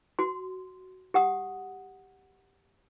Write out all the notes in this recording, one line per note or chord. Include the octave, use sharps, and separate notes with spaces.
F#4 C6
G4 F#5 D#6